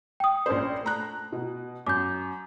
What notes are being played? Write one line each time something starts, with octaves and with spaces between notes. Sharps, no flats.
G5 D#6
A#1 C#4 C5
A3 A#5 F#6
B2
F#2 D6 G6